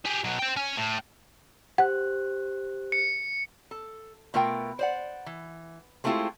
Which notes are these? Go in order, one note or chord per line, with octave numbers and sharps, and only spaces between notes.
G4 G#4
B2 F#3
C5 G5
C#4 G#5
A2
G4 C5 F#5 F#6
C#7
A4
B2 A3 F4 A#4 G5
C5 D5 F#5
E3
G#3 A3 C4 E4 F4 G4